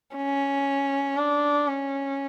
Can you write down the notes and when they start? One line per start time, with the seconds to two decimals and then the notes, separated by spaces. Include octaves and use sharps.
0.16 C#4
1.18 D4
1.68 C#4